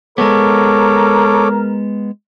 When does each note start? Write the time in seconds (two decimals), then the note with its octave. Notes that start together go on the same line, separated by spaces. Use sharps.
0.18 G#3 B3 A4 A#4 C#5 D6